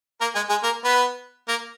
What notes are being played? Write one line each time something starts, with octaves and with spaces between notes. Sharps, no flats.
A#3 A#4
G#3 G#4
G#3 G#4
A#3 A#4
B3 B4
A#3 A#4